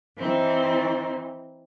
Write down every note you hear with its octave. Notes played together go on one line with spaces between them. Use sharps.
E3 C4 D#4